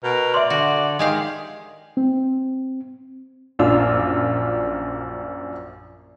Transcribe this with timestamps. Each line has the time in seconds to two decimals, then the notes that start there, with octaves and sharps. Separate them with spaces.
0.04 B2 A#4
0.34 D5 E5 C6
0.50 D3 F#4
0.99 D#3 G#3 G4 F5
1.97 C4
3.59 A#1 F#2 D4 F4 E6